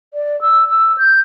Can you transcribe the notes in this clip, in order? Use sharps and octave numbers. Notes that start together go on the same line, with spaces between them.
D5
E6
E6
G6